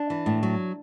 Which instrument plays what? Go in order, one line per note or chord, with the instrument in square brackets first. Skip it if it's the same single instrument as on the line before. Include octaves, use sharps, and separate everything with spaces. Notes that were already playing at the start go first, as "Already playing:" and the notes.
Already playing: [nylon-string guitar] D4
E3
A2
F#3